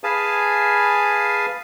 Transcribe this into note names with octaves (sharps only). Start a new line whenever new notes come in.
G#4 B4 F5 G#5 A5